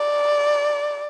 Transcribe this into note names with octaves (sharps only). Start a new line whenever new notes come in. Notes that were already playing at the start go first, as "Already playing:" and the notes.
Already playing: D5